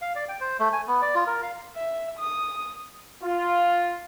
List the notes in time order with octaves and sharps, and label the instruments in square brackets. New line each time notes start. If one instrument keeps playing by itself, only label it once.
[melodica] F5
D5
G5
C5
A3
G#5
B3
D5
F4
A#4
F5
[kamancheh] E5
D#6
[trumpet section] F4